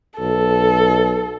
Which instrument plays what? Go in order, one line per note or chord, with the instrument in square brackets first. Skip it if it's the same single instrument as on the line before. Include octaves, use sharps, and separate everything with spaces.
[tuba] B1 [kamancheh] A4